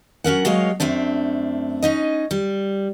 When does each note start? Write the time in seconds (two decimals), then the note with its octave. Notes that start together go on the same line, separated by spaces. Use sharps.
0.24 F#3 C#4 A#4 F#5
0.45 F#3 G#3 A#3 C#5 D#5 F5
0.80 F#2 A3 C4 D4
1.82 C#4 D#4 D#5
2.31 G3